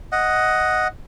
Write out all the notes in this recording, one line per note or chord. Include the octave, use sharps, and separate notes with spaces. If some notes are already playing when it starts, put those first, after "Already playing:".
D#5 F#5